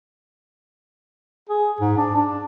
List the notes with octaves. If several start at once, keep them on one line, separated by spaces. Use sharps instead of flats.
G#4
G#2
D4
D4